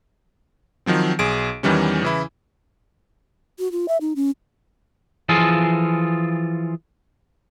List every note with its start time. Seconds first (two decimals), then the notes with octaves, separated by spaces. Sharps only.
0.86 D#3 F3 F#3 C4
1.19 B1 G#4 D7
1.63 E2 D#3 E3 G3 C#4
2.03 C#3 E3 E4
3.59 F#4
3.72 F4
3.88 E5
4.01 D#4
4.16 C#4
5.29 E3 F3 F4 G#4 A4